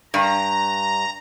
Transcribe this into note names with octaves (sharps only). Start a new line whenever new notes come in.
G2 A#5